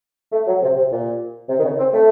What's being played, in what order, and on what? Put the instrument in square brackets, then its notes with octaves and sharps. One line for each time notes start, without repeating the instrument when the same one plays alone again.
[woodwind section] A3
F#3
C3
C3
A#2
C3
D#3
C#3
C4
A3